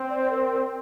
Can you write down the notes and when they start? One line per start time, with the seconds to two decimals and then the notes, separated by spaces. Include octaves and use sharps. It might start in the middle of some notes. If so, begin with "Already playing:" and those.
Already playing: C4
0.10 D5
0.22 C5
0.31 A#4